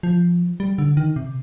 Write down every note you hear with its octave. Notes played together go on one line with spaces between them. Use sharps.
F3
G3
D3
D#3
C3